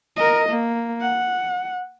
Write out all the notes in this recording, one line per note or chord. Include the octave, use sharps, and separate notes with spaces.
A#4 D#5
A#3
F#5